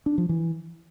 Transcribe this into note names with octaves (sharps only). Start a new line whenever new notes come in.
D4
F3
E3